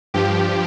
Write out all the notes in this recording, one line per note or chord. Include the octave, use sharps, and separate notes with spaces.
G2 F3 G4